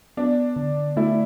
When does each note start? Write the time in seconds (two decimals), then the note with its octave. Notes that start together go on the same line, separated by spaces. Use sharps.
0.17 B3 D4
0.56 D3
0.97 A3 E4